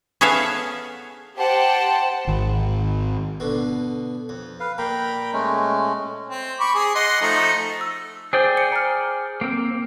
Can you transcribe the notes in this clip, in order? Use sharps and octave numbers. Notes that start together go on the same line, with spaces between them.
B3 C#4 G#4 A4 E5 F5
G4 C5 F#5 G5 A5
G#1 D#3
B2 D3
F2
B4 F5
A#2 G5 A#5 B5
G#3 A3 C#4
C4
B5 C#6 D6
G#4
D#5 F#5 C6
F3 A3 D#4
E6
G#4 C5 D5 G5
C#7
A#5 F6
A#3 C4